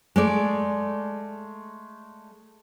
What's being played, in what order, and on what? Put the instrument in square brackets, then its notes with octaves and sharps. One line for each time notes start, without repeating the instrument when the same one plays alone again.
[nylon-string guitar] G#3 A3 D5